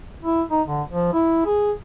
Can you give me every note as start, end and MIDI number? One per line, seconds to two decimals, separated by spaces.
0.23 0.42 64
0.51 0.62 63
0.67 0.82 50
0.90 1.12 53
1.13 1.44 64
1.46 1.72 68